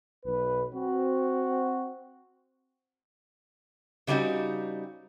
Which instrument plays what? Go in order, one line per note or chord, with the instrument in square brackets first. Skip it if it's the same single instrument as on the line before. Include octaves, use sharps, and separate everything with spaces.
[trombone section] B1 B4
C4 F#4
[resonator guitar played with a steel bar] C#3 G3 C4 D#4 F#4